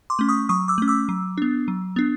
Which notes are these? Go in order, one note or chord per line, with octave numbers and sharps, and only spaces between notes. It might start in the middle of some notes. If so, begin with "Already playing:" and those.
C6 D6
A3 C#4
C#6 D#6
F#3 C#6 D#6
D6 E6
A3 C#4
D6 E6
F#3
B3 D4
F#3
B3 D4